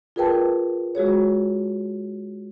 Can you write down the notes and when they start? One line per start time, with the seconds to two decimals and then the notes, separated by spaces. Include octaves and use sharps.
0.16 F4 G#4 A#4 B4 G5 A5
0.95 G#3 F#4 G#4 C#5